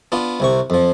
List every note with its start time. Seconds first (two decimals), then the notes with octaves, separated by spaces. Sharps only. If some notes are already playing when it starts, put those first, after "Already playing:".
0.12 B3 D4 F4
0.40 C2 C3 C#6
0.70 F2 F3